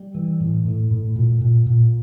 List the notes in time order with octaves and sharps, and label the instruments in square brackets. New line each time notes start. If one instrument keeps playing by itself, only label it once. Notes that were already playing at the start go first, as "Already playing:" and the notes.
Already playing: [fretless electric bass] G3
E3
A2
A2
A2
A#2
A#2
A#2